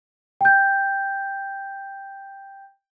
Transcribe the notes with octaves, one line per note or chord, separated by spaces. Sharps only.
G5 G6